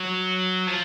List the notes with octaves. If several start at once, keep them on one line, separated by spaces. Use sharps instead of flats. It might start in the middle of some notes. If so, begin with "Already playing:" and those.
Already playing: F#3
F3